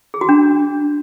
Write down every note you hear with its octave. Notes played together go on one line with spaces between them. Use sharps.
G#4
F#4
D4